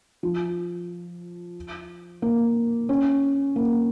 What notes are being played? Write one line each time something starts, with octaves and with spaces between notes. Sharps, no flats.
F3
A#3
C#4
A#3